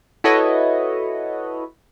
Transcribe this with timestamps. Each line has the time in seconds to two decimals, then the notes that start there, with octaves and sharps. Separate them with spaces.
0.24 E4 F#4 A4 B4 C#5 D#5